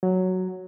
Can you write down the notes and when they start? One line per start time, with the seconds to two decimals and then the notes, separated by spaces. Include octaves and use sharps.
0.03 F#3